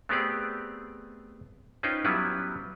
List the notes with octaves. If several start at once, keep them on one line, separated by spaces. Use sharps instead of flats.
A3 B3 C4 G4 G#4 D5
C#4 D#4 F4 B4 C5 G5
F#3 G3 B3 C#4 E4 B4